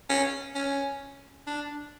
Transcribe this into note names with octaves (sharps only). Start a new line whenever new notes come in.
C#4
C#4
D4